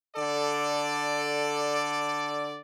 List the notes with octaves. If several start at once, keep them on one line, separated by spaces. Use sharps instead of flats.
D3 A4 D5